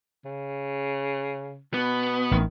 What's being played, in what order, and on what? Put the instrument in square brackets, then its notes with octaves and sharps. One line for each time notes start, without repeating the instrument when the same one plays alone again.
[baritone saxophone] C#3
[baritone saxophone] B2 [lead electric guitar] B3
[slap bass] A1 [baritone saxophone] D#3